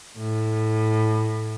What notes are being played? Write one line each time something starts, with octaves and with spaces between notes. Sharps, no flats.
A2